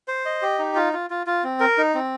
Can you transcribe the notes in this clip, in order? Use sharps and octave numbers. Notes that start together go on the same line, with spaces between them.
C5
D#5
G4
D#4
F4
F4
F4
F4
C4
A#4
D#4
C4